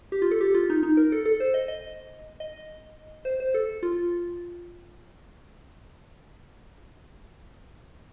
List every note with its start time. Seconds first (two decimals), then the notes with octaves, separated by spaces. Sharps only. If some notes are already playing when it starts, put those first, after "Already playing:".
0.12 G4
0.22 F4
0.31 A4
0.41 G4
0.54 F4
0.70 D#4
0.83 D#4
0.97 A#4
1.12 A4
1.25 A4
1.40 C5
1.54 D#5
1.68 D#5
2.40 D#5
3.25 C5
3.40 C5
3.54 A4
3.83 F4